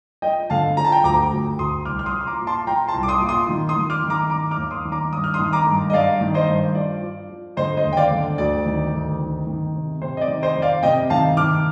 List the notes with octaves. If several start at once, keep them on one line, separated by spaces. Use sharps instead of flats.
F3 D#5 G5
D3 F5 A5
F3 A#5
A5
G5 A#5
D2 A#5 D6
D2
D2 C6 D#6
C2 D6 F6
F6
C6 D#6
F3
C6
A#5 D6
A#2
A5 C6
F3 G5 A#5
A5 C6
C2
D6
C6 D#6
A#2
C6 D#6
D#3
C6 D#6
D#3
D6 F6
D#3
A#5 D6
D#3 A#5 D6
D6 F6
D#2
C6 D#6
D#3
A#5 D6
G2 D#6
F6
C6 D#6
D#3
A#5 D6
G2
D#5
G2 D5 F5
D#3
C5 D#5
G2
F3 D5
F3
F3
D3 C5 D#5
C5 D#5
D#2
G5
D5 F5
D3
D2 D5
D#3
D2
D#3
D#3
C3
C3 C5
D#5
D5
D#3
C5 D#5
F2
D5 F5
C3 D#5 G5
D#3 F5 A5
D#3 D6 F6